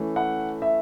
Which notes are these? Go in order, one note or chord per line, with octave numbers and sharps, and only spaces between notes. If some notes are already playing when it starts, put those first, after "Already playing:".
Already playing: E3 A3 C#4
F#5
E5